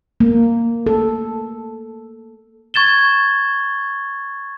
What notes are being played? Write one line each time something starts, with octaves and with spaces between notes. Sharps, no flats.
A#3
A4
C#6 G#6 A6 E7 G7